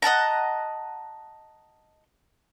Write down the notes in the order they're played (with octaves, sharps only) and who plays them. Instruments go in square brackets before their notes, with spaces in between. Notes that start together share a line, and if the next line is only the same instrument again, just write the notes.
[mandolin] D#5 F#5 A5 A#5